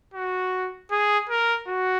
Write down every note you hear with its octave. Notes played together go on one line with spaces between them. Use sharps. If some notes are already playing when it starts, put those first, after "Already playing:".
F#4
G#4
A#4
F#4